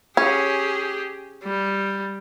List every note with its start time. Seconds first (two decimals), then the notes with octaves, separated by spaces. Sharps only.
0.17 C#4 G4 G#4
1.44 G3